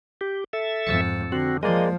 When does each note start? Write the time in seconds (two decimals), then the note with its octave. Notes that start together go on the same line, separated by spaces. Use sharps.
0.21 G4
0.53 A4 E5
0.87 F2 G#2 E6 A6 C#7
1.32 D3 C4 F#4
1.63 F3 G#3 A#3 D5 D#5